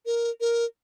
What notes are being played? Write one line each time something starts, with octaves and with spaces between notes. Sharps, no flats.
A#4
A#4